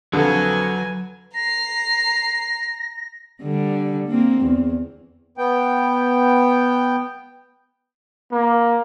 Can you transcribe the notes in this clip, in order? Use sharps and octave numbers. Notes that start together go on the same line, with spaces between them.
F2 D3 F#3 B4 G#5
A#5 A#6 C7
D3 G3
A#3 C4
E2
B3 G5
A#3